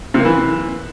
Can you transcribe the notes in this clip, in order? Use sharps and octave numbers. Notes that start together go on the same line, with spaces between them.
C3
A#3
E3